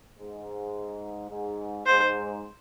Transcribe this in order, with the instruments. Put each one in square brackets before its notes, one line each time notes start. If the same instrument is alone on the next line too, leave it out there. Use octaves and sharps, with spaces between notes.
[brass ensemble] G#2
G#2
[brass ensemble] G#2 [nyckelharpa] C5